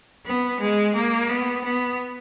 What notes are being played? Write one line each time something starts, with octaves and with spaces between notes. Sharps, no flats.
B3
G#3
A#3
B3
B3